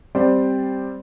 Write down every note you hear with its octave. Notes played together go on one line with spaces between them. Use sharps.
G3 C4 C5 D5